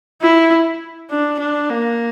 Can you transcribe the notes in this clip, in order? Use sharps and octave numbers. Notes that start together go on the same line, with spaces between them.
E4
D4
D4
A#3